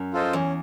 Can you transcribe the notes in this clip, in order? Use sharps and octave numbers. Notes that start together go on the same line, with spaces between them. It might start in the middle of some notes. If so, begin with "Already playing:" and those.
Already playing: F#2
F4 A4 C5 D#5
E2 C#4